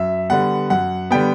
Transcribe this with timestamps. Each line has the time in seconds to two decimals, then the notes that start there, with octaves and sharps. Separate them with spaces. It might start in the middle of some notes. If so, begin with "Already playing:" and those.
Already playing: F#2 E5
0.29 D3 G3 B3 F#5
0.70 F#2 F#5
1.11 D3 G3 B3 G5